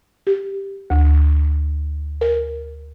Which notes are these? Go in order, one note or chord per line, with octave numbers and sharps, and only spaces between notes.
G4
D2
A#4